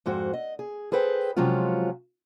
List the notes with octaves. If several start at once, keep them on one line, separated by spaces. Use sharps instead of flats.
F2 G#2 F#4 C5
D#5
G#4
G#4 A4 B4 C5 G5
C3 F3 F#3 G#3 C#4 F4